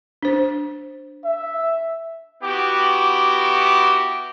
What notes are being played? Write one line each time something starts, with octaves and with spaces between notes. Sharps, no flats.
D4 C5
E5
B3 E4 F#4 G4 D6